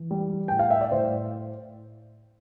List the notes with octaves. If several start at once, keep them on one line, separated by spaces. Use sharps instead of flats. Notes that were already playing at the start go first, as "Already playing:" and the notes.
Already playing: E3
G3
A2 G5
F5
E5
D5
A2 C5